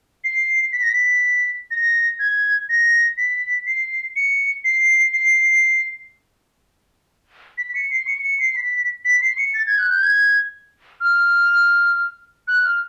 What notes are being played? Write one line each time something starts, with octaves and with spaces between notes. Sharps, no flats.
C7
B6
A#6
B6
A#6
G#6
A#6
B6
C7
C#7
C7
C7
B6
C#7
C7
C#7
C#7
C7
B6
B6
C7
C#7
A6
G#6
F#6
G6
G#6
F6
F#6
F6